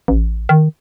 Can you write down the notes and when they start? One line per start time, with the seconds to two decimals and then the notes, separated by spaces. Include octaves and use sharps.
0.08 A1
0.49 D#3